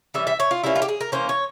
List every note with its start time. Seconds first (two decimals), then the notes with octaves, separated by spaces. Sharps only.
0.14 E3 G3 C#4 E5
0.27 E5
0.40 C#5
0.51 F4
0.64 E3 G3 A#3 C#4 E4
0.76 F4
0.82 G4
0.88 G#4
1.01 A#4
1.12 E3 A#3 C#4 C5
1.29 C#5